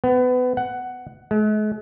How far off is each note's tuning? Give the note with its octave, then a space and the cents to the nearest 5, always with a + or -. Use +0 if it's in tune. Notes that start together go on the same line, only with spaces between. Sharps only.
B3 +25
F#5 +10
G#3 +45